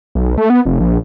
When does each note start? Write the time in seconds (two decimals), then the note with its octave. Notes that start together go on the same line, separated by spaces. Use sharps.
0.15 B1
0.38 A3
0.50 B3
0.66 F1
0.80 A#1